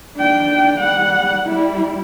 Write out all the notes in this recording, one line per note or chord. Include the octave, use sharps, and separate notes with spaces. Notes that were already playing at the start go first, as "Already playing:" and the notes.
D4 G5
G3 F#5
G3 E4